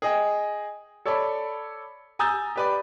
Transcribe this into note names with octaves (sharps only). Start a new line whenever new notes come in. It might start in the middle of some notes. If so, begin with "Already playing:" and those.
G#4 D#5 G5
A4 C#5 D5 A5 B5
G#5 A#5 D#6 E6 G6 A6
G4 B4 D5